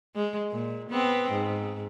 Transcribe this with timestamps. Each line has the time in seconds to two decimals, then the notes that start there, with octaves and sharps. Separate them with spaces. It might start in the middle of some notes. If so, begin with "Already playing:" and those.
0.15 G#3
0.51 A#2
0.90 B3 C4
1.31 G#2